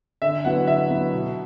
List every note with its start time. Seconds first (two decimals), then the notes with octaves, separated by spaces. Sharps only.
0.22 D3 E5
0.45 F#3 B3 E4 B4 F#5
0.67 D3 E5
0.90 F#3 B3 E4 B4
1.13 B2